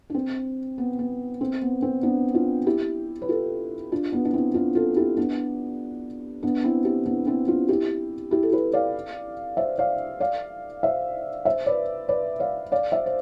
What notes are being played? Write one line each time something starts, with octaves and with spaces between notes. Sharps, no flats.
D4
C4
B3
B3
C4
B3
C4
B3 D4
D4 F4
E4 G4
B4
F4 A4
D4 F4
B3 D4
D4
C4 E4
D4 F4
F4 A4
E4 G4
B3 D4
B3 D4
C4 E4
E4 G4
B3 D4
C4 E4
D4 F4
E4 G4
E4 G4
A4
G4 B4
D5 F5
C5 E5
D5 F5
D5 F5
C5 E5
C5 E5
B4 D5
B4 D5
D5 F5
D5 F5
C5 E5
C5